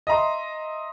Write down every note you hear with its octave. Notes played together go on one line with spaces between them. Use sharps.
D#5 E5 A#5 C6